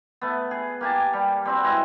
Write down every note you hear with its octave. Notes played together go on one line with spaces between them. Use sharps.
A3 B3
G#4
A#3 G4 G#5 A5
G3
G3 C4 F#4 B4
G#3 E4 C5 D#5